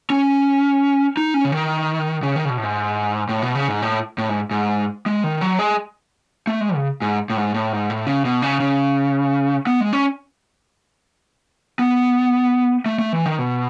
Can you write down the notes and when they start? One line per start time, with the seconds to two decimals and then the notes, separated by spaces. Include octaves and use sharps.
0.10 C#4
1.17 D#4
1.34 C#4
1.45 C#3
1.52 D#3
2.23 C#3
2.36 D#3
2.45 C#3
2.50 B2
2.58 A2
2.63 G#2
3.29 A2
3.42 B2
3.55 C#3
3.68 G#2
3.82 A2
4.18 A2
4.29 G#2
4.51 G#2
5.06 G#3
5.24 D#3
5.41 F#3
5.59 G#3
6.47 A3
6.61 G#3
6.75 C#3
7.02 G#2
7.30 A2
7.37 G#2
7.54 A2
7.72 G#2
7.90 A2
8.07 C#3
8.25 B2
8.42 C#3
8.60 C#3
9.67 B3
9.81 G#3
9.93 C#4
11.79 B3
12.86 A3
12.99 A3
13.13 E3
13.26 D#3
13.39 B2